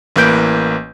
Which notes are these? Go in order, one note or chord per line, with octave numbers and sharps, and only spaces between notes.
A1 E3 A#3 B4 G6 D7